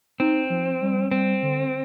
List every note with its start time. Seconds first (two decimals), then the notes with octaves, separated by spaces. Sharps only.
0.20 C4 D#4
0.50 F3
0.82 G3
1.11 G3 C4
1.43 D3